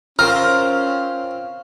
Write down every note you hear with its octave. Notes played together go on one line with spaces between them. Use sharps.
C4 C#4 F4 A#4 F6